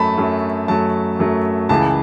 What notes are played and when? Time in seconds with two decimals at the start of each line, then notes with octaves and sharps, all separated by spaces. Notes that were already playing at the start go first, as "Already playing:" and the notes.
Already playing: F#2 F#3 A3 A5 B5
0.18 F#2 F#3 A3
0.68 F#2 F#3 A3 A5
1.19 F#2 F#3 A3
1.69 C#2 C#3 E3 A5